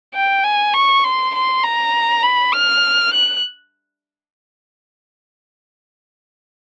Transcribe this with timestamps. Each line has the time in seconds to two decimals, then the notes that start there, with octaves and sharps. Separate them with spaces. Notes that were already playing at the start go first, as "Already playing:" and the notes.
0.14 G5
0.43 G#5
0.73 C#6
1.04 C6
1.34 C6
1.63 A#5
2.23 B5
2.53 F6
3.13 F#6